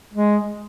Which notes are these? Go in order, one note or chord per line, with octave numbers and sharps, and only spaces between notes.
G#3